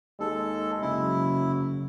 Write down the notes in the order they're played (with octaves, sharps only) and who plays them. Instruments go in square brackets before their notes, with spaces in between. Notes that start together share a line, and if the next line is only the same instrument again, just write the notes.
[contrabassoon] D#2 [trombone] G#3 [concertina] A4
[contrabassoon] F#1 [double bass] C#3 F#3 [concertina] E4